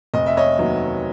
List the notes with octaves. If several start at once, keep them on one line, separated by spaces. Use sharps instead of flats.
F1 D#5
E5
C#5 D#5
D#2 D#3 F#3 B3